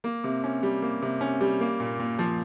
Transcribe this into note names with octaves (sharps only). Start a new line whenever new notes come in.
A#3
C3
C#4
G3
A#3
C3
C#4
G3
A#3
A#2
A#2
F3